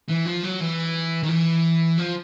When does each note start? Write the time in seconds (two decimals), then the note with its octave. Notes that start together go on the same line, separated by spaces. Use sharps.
0.08 E3
0.25 F3
0.43 F#3
0.60 E3
1.23 D#3
1.29 E3
1.98 F3